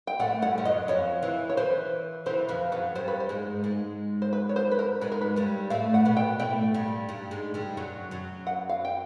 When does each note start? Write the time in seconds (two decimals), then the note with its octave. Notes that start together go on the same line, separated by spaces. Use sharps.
0.07 G5
0.19 A2 A3 F#5
0.42 G2 G3 F#5
0.58 F3
0.65 F#2 F#3 D#5
0.88 F2 F3 C#5
1.23 E3
1.50 C#5
1.57 E3 C5
2.26 E3 C5
2.49 F2 F3 B4
2.72 F#2 F#3 B4
2.95 G2 G3 C5
3.08 B4
3.20 C5
3.29 G#2 G#3
3.64 G#2 G#3
4.22 C5
4.33 B4
4.49 C#5
4.56 C5
4.72 B4
4.79 A#4
5.01 G#2 G#3 B4
5.12 A#4
5.21 B4
5.36 G2 G3
5.70 A2 A3 F5
5.94 F#5
6.05 B2 B3
6.17 G5
6.40 A2 A3 G5
6.74 G2 G3
7.09 G2 G3
7.31 G#2 G#3
7.54 G2 G3
7.77 F#2 F#3
8.11 F#2 F#3
8.47 F#5
8.69 F5
8.85 G5